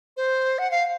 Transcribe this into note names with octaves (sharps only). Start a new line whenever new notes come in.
C5
F#5
F5